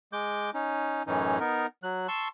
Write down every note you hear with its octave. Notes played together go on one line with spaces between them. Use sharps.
G#3 D6 G6
C#4 D#4
F#2 A2 E3 C#4 D#4
B3 D#4 A#4
F#3 F#6
A5 C6 C#6 E6